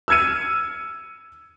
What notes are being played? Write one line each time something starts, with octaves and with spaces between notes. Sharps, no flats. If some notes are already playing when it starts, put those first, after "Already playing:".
E6 F6 G#6 C#7 D#7